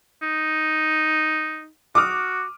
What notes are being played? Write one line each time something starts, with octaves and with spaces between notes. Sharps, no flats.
D#4
F#4 D6 D#6 F6